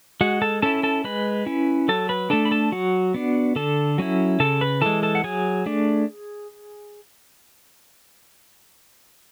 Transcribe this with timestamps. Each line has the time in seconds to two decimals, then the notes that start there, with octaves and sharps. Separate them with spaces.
0.21 G#3 F#4 F#5
0.42 A4 A5
0.62 C#4 E4 A4 A5
0.83 A4 A5
1.04 G#3 B4 B5
1.46 C#4 E4
1.88 F#3 A4 A5
2.09 B4 B5
2.30 A3 D4 A4 A5
2.45 B5
2.51 A4 A5
2.72 F#3 F#4 F#5
3.14 B3 D4
3.56 D3 A4 A5
3.98 F#3 C#4 E4
4.40 C#3 A4 A5
4.61 B4 B5
4.81 E3 G#3 A4 A5
5.03 A4 A5
5.15 F#5
5.24 F#3 G#4 G#5
5.66 A3 D4